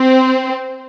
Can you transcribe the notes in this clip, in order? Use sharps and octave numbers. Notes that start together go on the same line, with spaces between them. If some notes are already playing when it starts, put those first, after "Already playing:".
Already playing: C4